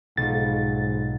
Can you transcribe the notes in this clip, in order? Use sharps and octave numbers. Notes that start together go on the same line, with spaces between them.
B1 G#2 F4 A6